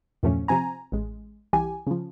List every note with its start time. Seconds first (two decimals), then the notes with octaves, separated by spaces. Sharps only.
0.23 E2 G2 A#2 F3 A3 C#4
0.48 C3 F3 C4 G#5 A#5
0.92 A1 G#3
1.53 C2 E3 G4 G#5
1.87 C#3 F3